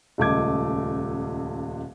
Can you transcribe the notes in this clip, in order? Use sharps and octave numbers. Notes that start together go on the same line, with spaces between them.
D#1 C#2 A3 D#5 D6 G#6